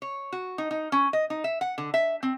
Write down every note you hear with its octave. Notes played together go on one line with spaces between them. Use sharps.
C#5
F#4
D#4
D#4
C#4
D#5
D#4
E5
F#5
D3
E5
C4